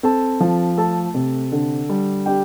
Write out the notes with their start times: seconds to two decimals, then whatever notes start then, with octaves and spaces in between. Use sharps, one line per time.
0.03 C4 A4 A5
0.40 F3
0.77 A3 A4 A5
1.14 C3
1.52 D3
1.90 G3
2.26 D4 G4 G5